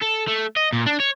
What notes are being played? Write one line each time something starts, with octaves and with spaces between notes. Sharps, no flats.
A4
A3
D#5
A#2
D4
C#5